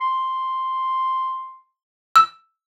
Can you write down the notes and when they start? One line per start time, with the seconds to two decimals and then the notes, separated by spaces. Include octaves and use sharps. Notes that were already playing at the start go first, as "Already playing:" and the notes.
0.01 C6
2.16 E6